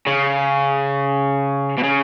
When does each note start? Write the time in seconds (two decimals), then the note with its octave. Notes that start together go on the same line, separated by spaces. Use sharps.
0.07 C#3
1.78 B2
1.83 C#3